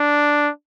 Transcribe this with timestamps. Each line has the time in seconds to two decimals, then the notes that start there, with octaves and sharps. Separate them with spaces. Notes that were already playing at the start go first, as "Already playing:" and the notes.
Already playing: D4